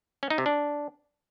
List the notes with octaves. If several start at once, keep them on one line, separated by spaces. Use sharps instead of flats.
C#4
D#4
C3
D4